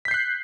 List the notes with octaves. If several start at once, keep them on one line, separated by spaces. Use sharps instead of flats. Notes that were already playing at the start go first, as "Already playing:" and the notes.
F#6 G6 B6 C7